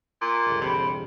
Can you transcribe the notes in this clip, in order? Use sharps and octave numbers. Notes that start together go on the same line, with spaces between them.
A#2
G1 C#2
E1 C3 C4 B5